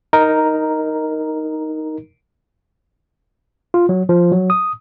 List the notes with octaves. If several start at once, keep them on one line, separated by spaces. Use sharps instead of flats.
D#4 A#4
F4
F#3
F3
F#3
D#6